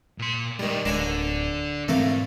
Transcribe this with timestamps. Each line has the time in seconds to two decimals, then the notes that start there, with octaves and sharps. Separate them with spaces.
0.19 A#2 C6
0.59 G2 D#3 G3 G#3
0.85 D1 D3 D4 A#4 C#5 G#5
1.88 C#2 G#2 E3 A3 C4 A#4 F5